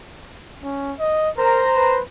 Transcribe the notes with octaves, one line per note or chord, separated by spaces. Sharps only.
C#4
D#5
A#4 C5 A#5
B4